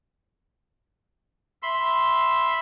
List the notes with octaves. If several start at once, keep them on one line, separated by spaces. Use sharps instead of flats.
E5 B5 C6